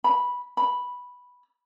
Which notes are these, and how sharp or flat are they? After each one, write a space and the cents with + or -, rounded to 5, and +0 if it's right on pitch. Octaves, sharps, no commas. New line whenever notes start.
B5 -10
B5 -5